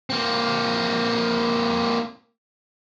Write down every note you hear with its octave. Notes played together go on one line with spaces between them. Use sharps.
A#3 C4